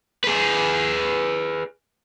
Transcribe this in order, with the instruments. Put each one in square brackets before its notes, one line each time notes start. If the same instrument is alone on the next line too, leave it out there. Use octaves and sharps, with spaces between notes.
[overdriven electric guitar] G#4 B4